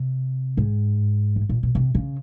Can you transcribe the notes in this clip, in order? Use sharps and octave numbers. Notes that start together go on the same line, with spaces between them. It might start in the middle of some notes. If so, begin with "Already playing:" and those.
Already playing: C3
G#2
A2
A#2
B2
C3
C#3